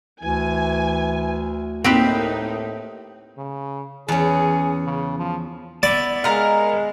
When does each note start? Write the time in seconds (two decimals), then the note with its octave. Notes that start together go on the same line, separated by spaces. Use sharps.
0.23 D2 E3 G#5
1.84 A2 A#3 C4 D#4 G4 B4
3.38 C#3
4.08 E2 C#4 G#4
4.86 C#3
5.18 F3
5.83 B3 E4 D5
6.24 G#3 A#4 F5